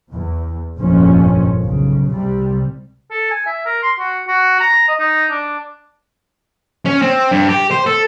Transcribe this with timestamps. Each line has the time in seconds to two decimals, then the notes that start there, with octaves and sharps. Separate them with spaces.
0.11 E2
0.78 G1 F2 A#2 F3 G#3 C#4
1.62 B1 C#3
2.12 C2 C3 G3
3.11 A4
3.30 G#5
3.46 E5
3.66 A#4
3.82 C6
3.99 F#4
4.27 F#4
4.60 A#5
4.88 D#5
5.00 D#4
5.30 D4
6.85 C#4
7.02 C4
7.31 G2
7.49 G4
7.71 C5
7.86 A4